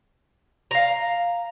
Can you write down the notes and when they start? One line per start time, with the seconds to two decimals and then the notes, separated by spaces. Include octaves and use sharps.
0.71 F5 A#5